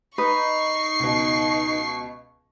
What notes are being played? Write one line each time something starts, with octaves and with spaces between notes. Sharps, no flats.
D#4 B4 C#6 C7
C#2 B2